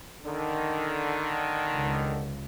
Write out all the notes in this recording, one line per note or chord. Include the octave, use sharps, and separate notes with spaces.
D3 D#3
C#2